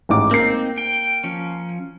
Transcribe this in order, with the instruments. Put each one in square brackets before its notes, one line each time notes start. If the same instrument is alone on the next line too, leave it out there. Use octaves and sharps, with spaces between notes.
[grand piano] A1 G#2 D6
[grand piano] A#3 C7 [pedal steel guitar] C4 D#4
[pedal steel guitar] G5
F3 C#4